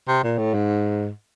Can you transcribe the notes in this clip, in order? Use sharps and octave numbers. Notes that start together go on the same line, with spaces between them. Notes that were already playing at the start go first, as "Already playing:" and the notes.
C3
A#2
A2
G#2